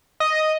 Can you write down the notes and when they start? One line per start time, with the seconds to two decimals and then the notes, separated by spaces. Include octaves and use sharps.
0.20 D#5